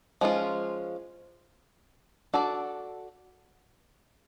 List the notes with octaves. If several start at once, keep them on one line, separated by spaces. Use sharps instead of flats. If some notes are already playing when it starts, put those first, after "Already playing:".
F3 G#3 C#4 F4
D4 F#4 A4 D5